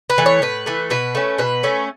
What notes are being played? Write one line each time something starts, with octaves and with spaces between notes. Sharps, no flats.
B4
E3 A3
C#5
A2 B4
E3 A3
B2 B4
A3 C#4
B2 B4
A3 C#4